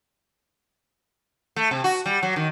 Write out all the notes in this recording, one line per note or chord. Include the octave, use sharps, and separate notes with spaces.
A3
C3
F#4
G3
F#3
D#3